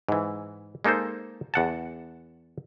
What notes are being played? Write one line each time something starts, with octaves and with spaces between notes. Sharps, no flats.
G#2 E3
G#3 A#3 D#4 A4 C5
E2 F#5 A5